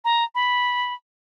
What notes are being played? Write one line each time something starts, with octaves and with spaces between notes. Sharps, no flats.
A#5
B5